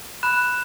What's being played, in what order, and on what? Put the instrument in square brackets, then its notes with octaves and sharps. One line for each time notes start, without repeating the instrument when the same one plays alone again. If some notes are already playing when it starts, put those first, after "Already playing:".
[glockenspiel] B5 F#6 E7